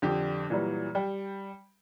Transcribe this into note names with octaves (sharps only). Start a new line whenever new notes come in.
F2 D3 D4 G4
A#2 E3 F#3 G3
G3 G5